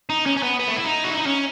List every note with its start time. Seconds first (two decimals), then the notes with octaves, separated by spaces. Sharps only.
0.10 D#4
0.26 C#4
0.37 C#4
0.43 B3
0.60 B3
0.68 A3
0.77 E4
0.85 D#4
1.04 F#4
1.11 E4
1.20 D#4
1.26 C#4